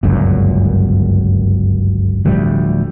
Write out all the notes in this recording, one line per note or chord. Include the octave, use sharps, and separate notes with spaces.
G1 C#2 F#2 A#2
D1 D2 F3 G3